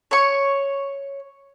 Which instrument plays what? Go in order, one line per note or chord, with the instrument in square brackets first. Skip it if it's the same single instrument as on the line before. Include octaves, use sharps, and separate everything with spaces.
[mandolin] C#5 C#6